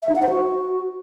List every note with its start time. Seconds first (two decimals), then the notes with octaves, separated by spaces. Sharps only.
0.02 E5
0.09 D#4
0.16 F#5
0.22 C5
0.29 F#4